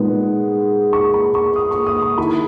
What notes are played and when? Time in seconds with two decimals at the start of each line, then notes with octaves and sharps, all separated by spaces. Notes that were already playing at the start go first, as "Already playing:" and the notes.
Already playing: A#2 G#3 B3 D#4
0.93 C#6
1.14 B5
1.35 C#6
1.56 D#6
1.71 C#6
1.87 D#6
2.02 C#6
2.18 D#3 A#3 E4 B5